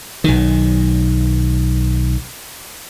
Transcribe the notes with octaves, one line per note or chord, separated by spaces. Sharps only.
B1 D#3